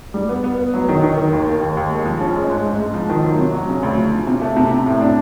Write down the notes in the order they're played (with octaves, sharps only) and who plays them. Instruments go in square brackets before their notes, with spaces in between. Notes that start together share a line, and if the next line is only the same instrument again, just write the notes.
[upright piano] G3
B3
B3
B3
F#3
D#3
D#3
D#3
D#2
A#3
D#2
D#2
G#3
F3
C#4
G#3
G#2
G#2
G#2
F3
D#3
F#3
C3
F#3
C#3
D2
F3
C#3
C3
A3
C3
C3
A2
D4